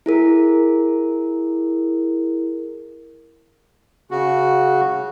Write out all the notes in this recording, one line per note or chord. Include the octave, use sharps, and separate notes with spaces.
E4 G#4 A#4
C#3 F#4